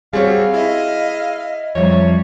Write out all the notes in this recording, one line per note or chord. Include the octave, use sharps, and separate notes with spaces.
G3 C4 F#4 G#4 C#5 F5
E4 D#5
F2 F3 G3 C#5 E5